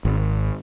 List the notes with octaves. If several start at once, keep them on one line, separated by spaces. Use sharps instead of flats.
G#1